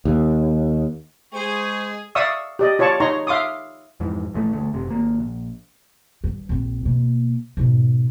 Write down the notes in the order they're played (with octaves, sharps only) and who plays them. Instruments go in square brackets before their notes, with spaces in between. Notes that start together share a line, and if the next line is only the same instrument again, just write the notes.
[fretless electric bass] D#2
[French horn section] G#3 [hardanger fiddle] G#4 G#5 [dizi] C5 [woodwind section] C#6
[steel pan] D5 E5 F5 C#6 D#6 E6
G4 D5 D#5
F4 C#5 D5 A5 C#6
D#4 C#5 A#5 C6 C#6
E5 F5 C6 D6 D#6
[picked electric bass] F2 G#2 E3
A#1 E3 F3 A3
G1 D2 A3
F#1 C3
G#1 A#3
A#1
[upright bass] G2
A#1 C4
B2 A#3
G#2 B2